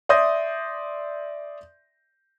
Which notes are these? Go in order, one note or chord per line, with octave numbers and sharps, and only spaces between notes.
D5 E5 C6 D#6 G6 A#6